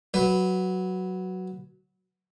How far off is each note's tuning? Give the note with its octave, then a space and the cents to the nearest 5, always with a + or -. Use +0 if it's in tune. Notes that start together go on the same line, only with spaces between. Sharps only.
F#3 +0 B4 +0